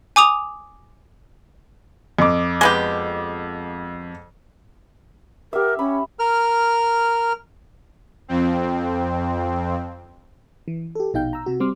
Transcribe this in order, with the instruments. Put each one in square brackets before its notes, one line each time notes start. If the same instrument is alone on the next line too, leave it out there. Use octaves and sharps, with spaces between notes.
[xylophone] G#5 D6 D#6 F7
[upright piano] F2 D6
[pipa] G#3 B3 G4
[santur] G4 E5 [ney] A#4
[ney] C#4 [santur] B5
[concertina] A#4 F6
[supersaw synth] F2 C4
[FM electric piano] E3
G4 A4
A#1 B2 D#4 F5 G5 G6
A#5 E6
C3 F#4
G3 C4 C6 D6 F6